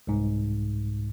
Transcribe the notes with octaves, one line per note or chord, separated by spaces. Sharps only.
C2 G#2